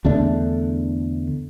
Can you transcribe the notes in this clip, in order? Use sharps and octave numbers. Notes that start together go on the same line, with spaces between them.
E2 D3 A3 D4